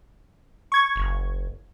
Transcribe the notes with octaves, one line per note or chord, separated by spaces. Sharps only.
C#6 G#6
F#1